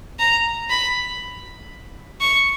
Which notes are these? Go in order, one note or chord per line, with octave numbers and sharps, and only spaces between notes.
A#5
B5
C#6